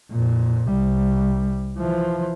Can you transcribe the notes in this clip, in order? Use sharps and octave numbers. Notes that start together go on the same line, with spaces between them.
F2 A#2
C2 G3
E3 F3